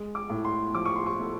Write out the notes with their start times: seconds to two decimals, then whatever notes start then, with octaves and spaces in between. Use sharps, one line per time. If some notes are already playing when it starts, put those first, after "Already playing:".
Already playing: G#3
0.15 D6
0.30 A2
0.45 C6
0.75 F3 D6
0.85 C#6
0.96 C6
1.06 C#6
1.19 A3